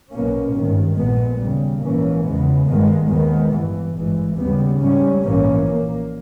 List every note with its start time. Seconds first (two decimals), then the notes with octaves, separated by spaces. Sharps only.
0.12 B1 B2 A#3 C#4
0.54 G#1 G2 D#3
0.97 A#1 A#2 G#3 B3
1.39 D#2 C#3 G3
1.81 A#1 G#2 E3 A#3 C#4
2.24 E2 C#3 G#3 B3
2.66 G2 D#3 G#3 B3
3.09 D#2 D#3 G#3 B3
3.52 G1 G2 E3
3.94 G#1 G2 E3 G#3
4.37 D#2 C#3 G3 B3
4.79 G#2 G3 C#4
5.21 A#1 G#2 E3 A#3 C#4
5.64 A#1 A#2 A#3